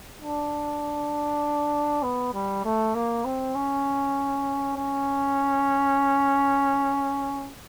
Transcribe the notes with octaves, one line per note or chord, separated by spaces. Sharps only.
D4
B3
G3
A3
A#3
C4
C#4
C#4